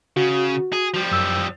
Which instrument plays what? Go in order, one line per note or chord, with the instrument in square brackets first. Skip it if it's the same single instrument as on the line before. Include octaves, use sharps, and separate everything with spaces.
[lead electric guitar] C#3 [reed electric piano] F#4
[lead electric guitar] G#4
F3 G3
[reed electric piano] F#2 E6